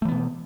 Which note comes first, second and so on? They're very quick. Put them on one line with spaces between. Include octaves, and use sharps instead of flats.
A3 E3 B3 B2